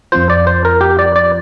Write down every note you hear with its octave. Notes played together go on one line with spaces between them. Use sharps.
F2 F3 C4 F4 C5
D5
C5
A#4
G4
D5
D5